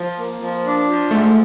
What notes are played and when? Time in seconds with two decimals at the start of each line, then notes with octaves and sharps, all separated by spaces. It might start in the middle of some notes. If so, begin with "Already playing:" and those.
Already playing: F3
0.17 A#3
0.41 F3
0.65 D4
0.88 F3
1.10 G#2 A3